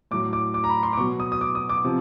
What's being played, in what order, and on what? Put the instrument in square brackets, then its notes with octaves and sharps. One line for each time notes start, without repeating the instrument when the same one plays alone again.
[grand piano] A2 F#3 D6
D6
D6
A#5
B5
C6
D6
B2 C#6
F#3
D#6
D#6
D6
D#6
D6
C3 F3